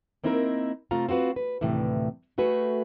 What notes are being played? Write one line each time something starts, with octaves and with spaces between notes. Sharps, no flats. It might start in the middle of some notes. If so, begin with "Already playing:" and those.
A#3 C4 D#4 E4 G#4 A#4
C3 A3 C4 F4 F5 A#5
C4 F4 F#4 B4
B4
D2 A2 C3 D#3 E3
A3 F#4 G#4 B4